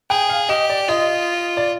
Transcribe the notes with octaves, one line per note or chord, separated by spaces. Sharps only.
G#4 G5
F5
G4 D#5
D5
F4 D#5
D5